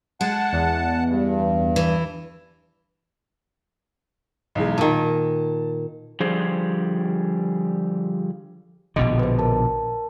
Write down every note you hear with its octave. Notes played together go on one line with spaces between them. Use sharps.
G#3 F#5 A5
E2
G2
E3
B1 E2 G#3
A#2 D#3 A5
D3 F3 G3 G#4 C5
A#1 B2 D3 D#5
B4 C5
A#4 A5